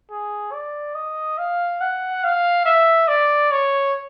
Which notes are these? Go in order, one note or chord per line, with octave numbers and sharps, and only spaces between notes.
G#4
D5
D#5
F5
F#5
F5
E5
D5
C#5